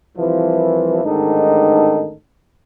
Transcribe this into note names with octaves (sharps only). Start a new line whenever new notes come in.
C2 E3 F3
A1 G#2 D#3 D4 D#4 A4